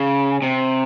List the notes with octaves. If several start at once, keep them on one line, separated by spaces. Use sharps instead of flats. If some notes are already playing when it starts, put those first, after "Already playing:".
Already playing: C#3
C3